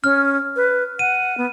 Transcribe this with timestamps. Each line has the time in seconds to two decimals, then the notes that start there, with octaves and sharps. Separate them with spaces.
0.04 C#4 F6
0.56 B4
0.99 F#5 D#7
1.38 B3